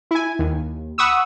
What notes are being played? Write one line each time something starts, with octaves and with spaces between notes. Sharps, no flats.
E4 G#5
D#2
F#5 B5 C#6 D#6 E6